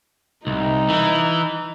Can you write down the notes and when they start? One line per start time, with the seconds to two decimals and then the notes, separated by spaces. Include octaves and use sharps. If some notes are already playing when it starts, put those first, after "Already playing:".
0.47 C2 D#4
0.89 E3